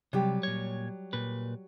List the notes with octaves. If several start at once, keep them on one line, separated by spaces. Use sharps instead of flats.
C3 F#3 G3 G4
A#2 C#5
A#2 B4